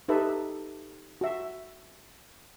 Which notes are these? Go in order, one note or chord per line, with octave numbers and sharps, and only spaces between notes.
D#4 G4 A4 B4 E5
F#4 E5